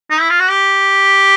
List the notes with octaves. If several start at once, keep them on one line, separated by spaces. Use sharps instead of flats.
D#4
E4
F4
F#4
G4